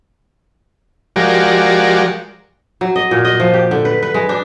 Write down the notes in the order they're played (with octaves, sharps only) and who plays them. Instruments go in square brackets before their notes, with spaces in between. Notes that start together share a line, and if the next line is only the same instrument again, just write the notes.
[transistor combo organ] F3 G#3 F#4 G4 A#4 D5
[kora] F#3
D#5
A#2
D#5
F3
G4
D3
B4
B4
G#3
D4